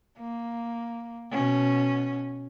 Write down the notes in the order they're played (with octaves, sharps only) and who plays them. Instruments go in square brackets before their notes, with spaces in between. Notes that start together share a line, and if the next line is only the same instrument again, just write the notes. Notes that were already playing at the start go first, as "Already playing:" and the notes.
[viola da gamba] A#3
B2 C#4